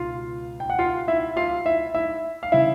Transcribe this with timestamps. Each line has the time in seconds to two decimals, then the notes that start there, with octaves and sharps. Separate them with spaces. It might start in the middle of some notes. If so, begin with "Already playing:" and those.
Already playing: C#2 B2 F4 F5
0.60 G5
0.70 F#5
0.79 F4 F5
1.08 E4 E5
1.36 F4 F5
1.66 E4 E5
1.95 E4 E5
2.43 F5
2.52 C#3 E3 E4 E5